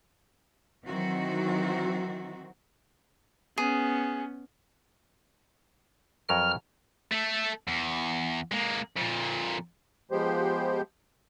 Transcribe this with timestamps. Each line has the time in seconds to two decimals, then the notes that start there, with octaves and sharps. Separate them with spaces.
0.85 D#3 E3 F#3 C4 D#4 F#4
3.58 B3 C#4 G#4
6.29 F2 F#3 A#4 F6
7.11 A3 A4
7.68 E2
8.52 G#3 A#3
8.97 F2 A#2
10.11 F3 G#3 B3 G4 C5